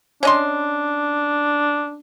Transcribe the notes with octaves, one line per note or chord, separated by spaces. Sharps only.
C#4 D4 D#5 C6